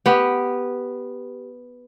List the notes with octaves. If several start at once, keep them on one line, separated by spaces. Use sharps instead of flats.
B3 G4